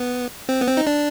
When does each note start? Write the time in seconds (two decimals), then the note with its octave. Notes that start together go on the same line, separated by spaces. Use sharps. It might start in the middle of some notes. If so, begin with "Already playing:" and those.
Already playing: B3
0.49 C4
0.61 B3
0.68 C4
0.77 D#4
0.87 D4